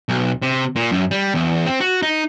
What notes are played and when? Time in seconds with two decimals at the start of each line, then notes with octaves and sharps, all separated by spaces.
0.09 B1
0.42 C3
0.76 A#2
0.92 F#2
1.11 G3
1.34 E2
1.66 C4
1.81 F#4
2.03 D#4